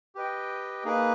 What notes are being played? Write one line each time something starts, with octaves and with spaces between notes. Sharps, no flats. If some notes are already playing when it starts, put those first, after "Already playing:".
G4 B4 D#5 G5
A#3 D#4 G#4 B4